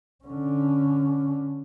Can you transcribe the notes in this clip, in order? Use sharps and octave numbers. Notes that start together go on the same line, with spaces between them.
D3 C#4